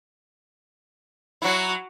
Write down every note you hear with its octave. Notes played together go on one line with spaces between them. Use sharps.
F#3 E4 F#4